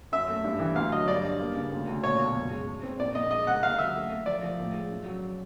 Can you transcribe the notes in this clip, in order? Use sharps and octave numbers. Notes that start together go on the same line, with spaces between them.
F#2 E5
A3
G2
E3
D2 F5
F#3 D#5
G2 D5
G2
A#3
C#3
D2
D2
A#2 C#5
B1
F#1
G#3
G#3
C4
A#1 D5
A#1 D#5
G#3 D#5
C#2 F#5
D#2 F5
F#3 E5
A3
A3
F3 D5
F3
A2
G#3
F#2
F#3